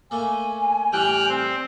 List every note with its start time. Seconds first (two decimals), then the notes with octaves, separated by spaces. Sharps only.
0.11 A3 A#3 G#5
0.93 A2 E3 G3 G5 F6 F#6
1.29 C4